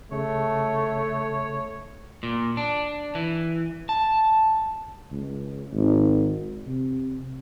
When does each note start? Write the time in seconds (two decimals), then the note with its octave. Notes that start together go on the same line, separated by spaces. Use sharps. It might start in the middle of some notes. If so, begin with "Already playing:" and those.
0.12 C#3 A3 C#5
2.23 A#2
2.57 D4
3.15 E3
3.89 A5
5.12 C#2
5.73 G#1
6.67 C3